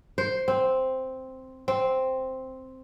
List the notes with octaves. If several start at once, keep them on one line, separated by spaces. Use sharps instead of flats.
C5
C4
C4